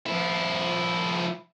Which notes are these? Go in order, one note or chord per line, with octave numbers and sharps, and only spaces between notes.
F3 E4